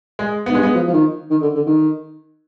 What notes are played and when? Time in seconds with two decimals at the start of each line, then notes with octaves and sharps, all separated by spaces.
0.19 G#3
0.46 G#2 B3
0.54 G2 G#3
0.63 B3
0.75 F3
0.88 F3
0.93 D#3
1.30 D#3
1.41 D3
1.55 D3
1.67 D#3